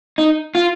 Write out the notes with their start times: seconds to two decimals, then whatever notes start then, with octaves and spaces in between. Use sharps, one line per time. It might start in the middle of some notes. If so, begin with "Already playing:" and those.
0.18 D#4
0.55 F4